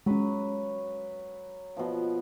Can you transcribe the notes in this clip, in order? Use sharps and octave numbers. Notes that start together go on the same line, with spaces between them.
F#3 G#3 C#4 B4
B2 F3